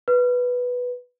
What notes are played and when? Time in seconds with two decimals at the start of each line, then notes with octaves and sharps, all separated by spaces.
0.08 B4